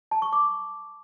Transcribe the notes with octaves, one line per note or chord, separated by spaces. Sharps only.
A5
C#6
D6